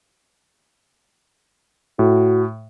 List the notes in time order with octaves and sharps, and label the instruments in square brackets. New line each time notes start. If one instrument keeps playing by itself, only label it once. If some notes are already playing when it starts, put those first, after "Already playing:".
[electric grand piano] A2 [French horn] F#4